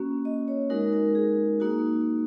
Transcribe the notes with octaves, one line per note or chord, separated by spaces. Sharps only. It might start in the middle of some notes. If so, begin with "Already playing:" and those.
Already playing: A#3 C#4 F#4
D#5
C#5
G#3 D#4 F#4 A#4
A#4
G#4
A#3 D#4 F#4